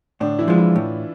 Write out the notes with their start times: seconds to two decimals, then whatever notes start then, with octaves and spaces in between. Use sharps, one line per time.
0.20 A2 D3 D4
0.39 E3 E4
0.48 F3 G#3 F4
0.58 E3 E4
0.76 A2